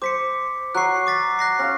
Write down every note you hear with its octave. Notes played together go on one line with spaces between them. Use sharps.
C5 D6 B6 C#7
F#3 C#6 F#6 C7
D6 A6 B6
F#6 A#6 C7
C#4 F5